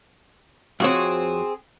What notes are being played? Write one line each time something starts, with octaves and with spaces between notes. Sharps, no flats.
F2 C4 F#4 G#4 C#5